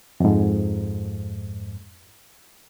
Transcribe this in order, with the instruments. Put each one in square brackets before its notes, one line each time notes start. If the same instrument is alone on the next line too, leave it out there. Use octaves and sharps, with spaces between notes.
[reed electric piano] F2 G#2